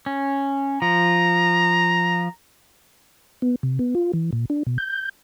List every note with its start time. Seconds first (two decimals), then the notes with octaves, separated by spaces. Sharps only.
0.06 C#4
0.82 F3 A#5
3.42 B3
3.63 C3
3.79 B3
3.95 F4
4.13 E3
4.33 A#2
4.50 D4
4.67 B2
4.78 G6